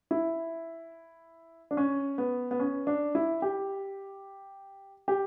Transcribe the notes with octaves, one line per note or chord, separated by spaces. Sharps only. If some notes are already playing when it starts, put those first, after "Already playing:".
E4
D4
C#4
B3
B3
C#4
D4
E4
G4
G4